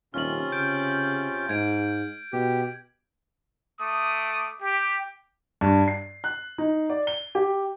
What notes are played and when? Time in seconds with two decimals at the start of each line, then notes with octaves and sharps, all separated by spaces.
0.14 D#1 C3 C#4 F4 F6 F#7
0.52 C#3 G6 D7
1.49 G#2 G#6 D7
2.33 B2 G4
3.79 A3 D6 D#6
4.61 G4
5.61 G2
5.88 C7
6.24 F#6
6.58 D#4
6.90 D5
7.07 G7
7.35 G4